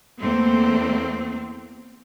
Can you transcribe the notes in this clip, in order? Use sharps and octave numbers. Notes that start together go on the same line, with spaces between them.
E2 A3 A#3 C4